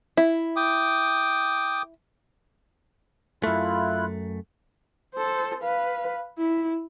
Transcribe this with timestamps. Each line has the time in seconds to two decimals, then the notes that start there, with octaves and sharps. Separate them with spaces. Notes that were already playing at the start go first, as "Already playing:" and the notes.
0.17 E4
0.56 G5 D6 D#6
3.44 F#2 A3 E4 F4 F#6
5.14 A4 C5
5.63 B4 F5
6.38 E4